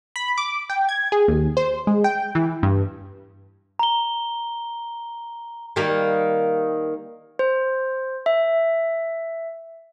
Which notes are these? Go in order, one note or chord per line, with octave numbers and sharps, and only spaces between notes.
B5
D6
G5
G#6
G#4
D#2
C5
G#3
G5
E3
G2
A#5 G7
D#3 G3 A#3
C5
E5